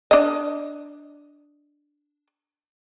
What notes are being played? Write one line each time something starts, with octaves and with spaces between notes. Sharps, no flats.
D4 D#5